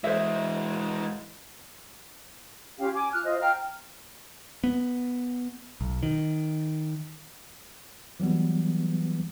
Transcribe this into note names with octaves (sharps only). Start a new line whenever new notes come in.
E3 G#3 C5 E5
C#4 F4 G4 F5
G#5 D6
F4 F6 F#6
F4 C5 D#5
F5 G5 A#5 F6
B3
B1
D#3
E3 F#3 G3 B3